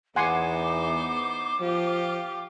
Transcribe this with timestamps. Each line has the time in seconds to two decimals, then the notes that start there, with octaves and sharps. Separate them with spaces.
0.16 E2 B3 D#4 C5 F#5 G#5 C6 D6
1.60 F3 F4 G4